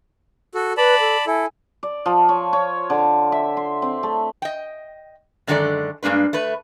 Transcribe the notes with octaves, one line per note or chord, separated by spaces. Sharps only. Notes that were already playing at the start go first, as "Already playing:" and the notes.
F#4 A4
B4 D5 A5 B5
A4
E4 A4 G#5
D5
F3
C#5
C#5
D3
E5
C6
C4
A3
D#5 G5
F#2 D3 D#3 G#3 A4 D5
G2 G#3 A#3 D4 B4
A3 B4